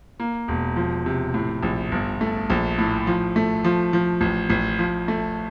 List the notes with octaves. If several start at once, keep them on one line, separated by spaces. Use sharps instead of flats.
A#3
E1
F3
C3
A2
A#1
G1
A3
A#1
A2
F3
A3
F3
F3
A1
A1
F3
A3